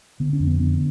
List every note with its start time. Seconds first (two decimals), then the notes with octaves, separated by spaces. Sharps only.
0.20 D3 B3
0.33 C#4
0.40 F2
0.47 B3
0.59 D3 B3